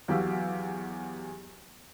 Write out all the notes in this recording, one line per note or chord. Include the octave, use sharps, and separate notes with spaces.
E2 F#3 G4 F5 E6